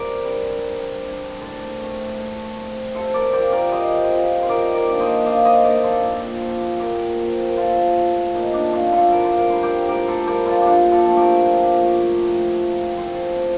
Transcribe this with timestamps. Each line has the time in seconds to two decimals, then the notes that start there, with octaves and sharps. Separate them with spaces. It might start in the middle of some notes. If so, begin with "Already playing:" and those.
Already playing: C3 A#4 D5
0.25 G3 D4
0.63 C3
1.01 G3 D4
1.41 A2 A4 C5
1.78 A3 C4
2.17 A2
2.56 A3 C4
2.94 C3 A4 C5
3.14 A#4 D5
3.33 F3 C4 G4 A#4
3.52 A#4 D5
3.72 C3 C5 D#5
4.10 F3 C4
4.43 C5
4.49 D#3 A#4 D5
4.74 A#4 D5
4.87 A#3 D4
5.00 C5 D#5
5.26 D#3 D5 F5
5.45 C5 D#5
5.64 A#3 D4 A#4 D5
5.84 A4 C5
6.03 A#2
6.41 F3 C4
6.80 A#2 G4 A#4
7.18 F3 C4
7.48 A#4
7.57 A#2 F4 A4
7.96 A3 C4
8.34 A#2 D#4
8.54 D4
8.72 A3 C4 D4 F4
8.92 F4 A4
9.12 A2 A#4
9.24 C5
9.38 A#4
9.50 G3 D4 C5
9.63 G4 A#4
9.89 A2 G4 A#4
10.07 A4 C5
10.27 G3 D4 G4 A#4
10.46 F4 A4
10.62 A#2 D4 F4 G4
10.91 F4 A4
11.05 F3 A3
11.17 G4 A#4
11.44 A#2
11.81 F3 A3
12.20 A2
12.58 F3 A3 C4
12.96 A2 A4 C5
13.36 F3 A3 C4